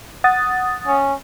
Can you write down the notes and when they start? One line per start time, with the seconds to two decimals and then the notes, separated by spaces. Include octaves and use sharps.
0.24 F#5 D#6 A6
0.87 C#4